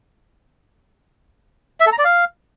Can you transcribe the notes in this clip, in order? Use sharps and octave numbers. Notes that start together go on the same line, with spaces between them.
E5
A4
A#5
D5
F5